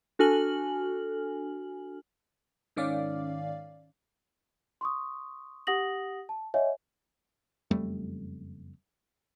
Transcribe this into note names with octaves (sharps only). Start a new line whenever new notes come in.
D4 F#4 A4 G#5 F6 F#7
G#2 D#3 C#4 D5 F5
C6 C#6 D#6
G4 F#5 D#6 A#6 F#7
A5
C#5 D#5 E5 F#5 G#5
F#1 F2 G3 A3